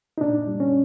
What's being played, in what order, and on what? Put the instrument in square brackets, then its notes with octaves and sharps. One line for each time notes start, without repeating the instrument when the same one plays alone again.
[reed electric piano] D#4
A#2 D4
G3
C#4